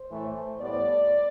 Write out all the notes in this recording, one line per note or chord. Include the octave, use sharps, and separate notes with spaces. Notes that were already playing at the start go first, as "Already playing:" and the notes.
Already playing: C5
A2 E3 A3
A2 G3 B3 D5